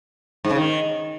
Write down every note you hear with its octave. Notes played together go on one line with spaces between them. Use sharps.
G#2
C#3
D#3